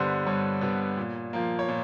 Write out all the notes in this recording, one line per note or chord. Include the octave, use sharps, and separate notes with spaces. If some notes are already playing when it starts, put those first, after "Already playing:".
Already playing: G2 D3 G3 B3 B4 C5
G2 C#5
D3 G3 B3
A#2
F3 A#3
C#5
A#2